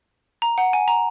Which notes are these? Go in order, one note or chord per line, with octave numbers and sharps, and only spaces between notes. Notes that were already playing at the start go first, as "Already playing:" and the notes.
A#5
F#5
G#5
A#5